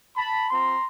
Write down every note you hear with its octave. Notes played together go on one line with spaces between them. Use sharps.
A5 B5
C4 F4 A#5 C6